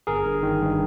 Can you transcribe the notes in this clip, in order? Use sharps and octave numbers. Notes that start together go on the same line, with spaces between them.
G1 G#4 A#4
G2
D#3
G2